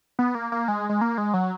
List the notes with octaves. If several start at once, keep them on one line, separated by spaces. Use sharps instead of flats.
B3
A#3
A#3
G#3
G#3
A#3
G#3
F#3